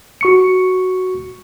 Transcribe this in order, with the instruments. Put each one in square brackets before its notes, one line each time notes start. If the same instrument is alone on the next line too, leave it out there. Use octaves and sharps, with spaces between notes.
[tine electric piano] F#4 C#6 C#7